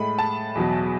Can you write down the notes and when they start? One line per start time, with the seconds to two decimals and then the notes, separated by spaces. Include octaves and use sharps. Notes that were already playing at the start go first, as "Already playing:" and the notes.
Already playing: A2 G#3 B5
0.19 A5
0.55 E2 B2 F#3